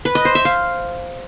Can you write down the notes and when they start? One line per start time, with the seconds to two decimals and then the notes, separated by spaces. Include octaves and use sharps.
0.05 B4
0.15 D#5
0.25 C5
0.35 E5
0.45 F5